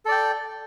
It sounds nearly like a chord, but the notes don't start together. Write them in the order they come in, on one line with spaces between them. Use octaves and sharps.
A4 D5 G5